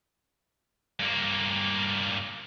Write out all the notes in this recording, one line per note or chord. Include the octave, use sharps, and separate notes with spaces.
G2 A#3